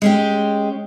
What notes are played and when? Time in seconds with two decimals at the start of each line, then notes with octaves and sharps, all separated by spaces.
0.02 G#3 C#4 G4